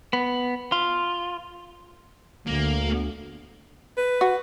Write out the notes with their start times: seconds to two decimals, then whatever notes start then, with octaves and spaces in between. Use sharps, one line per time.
0.13 B3
0.72 F4
2.47 D2 A#3
3.97 B4
4.21 F#4